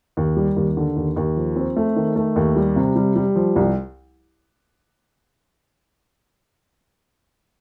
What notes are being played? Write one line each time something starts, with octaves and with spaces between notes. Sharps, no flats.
D#2
G3
D#2
D3
D#2
D#2
F3
C4
A3
D#3
A3
D#2
G3
C3
G3
G3
F3
C2